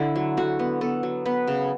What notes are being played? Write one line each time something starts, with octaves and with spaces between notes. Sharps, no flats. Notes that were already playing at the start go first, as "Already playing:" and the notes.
Already playing: D3 D4 E4 D5
F#3
D3 F#4
B3
B3 A4
F#3
B3 B4
C#3